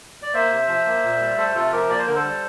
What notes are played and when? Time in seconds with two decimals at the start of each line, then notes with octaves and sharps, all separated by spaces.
0.23 D5
0.34 A#3 C5 E5
0.50 C3
0.68 F3
0.86 A#3
1.04 A#2
1.20 G3
1.38 A3 A4 C5
1.55 C3 F4 A4
1.72 F3 G4 A#4
1.90 A#3 D5
1.98 C5
2.07 D3 A#4
2.15 A4 C5
2.24 G3